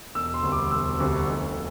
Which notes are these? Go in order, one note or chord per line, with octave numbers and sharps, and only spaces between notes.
E1 E6
C6
D2 C3 G3
D6
E1 E6
D2 C3 G3
F1